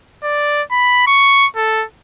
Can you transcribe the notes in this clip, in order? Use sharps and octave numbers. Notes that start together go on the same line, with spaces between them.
D5
B5
C#6
A4